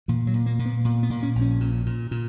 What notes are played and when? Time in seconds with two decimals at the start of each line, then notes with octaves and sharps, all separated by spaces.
0.08 A#2 E3
0.27 F#3
0.34 A#2
0.46 A#3
0.59 A#2
0.65 B3
0.85 A#2
1.03 B3
1.10 A#2
1.23 C#4
1.35 A#1
1.41 C#4
1.61 A#2
1.86 A#2
2.11 A#2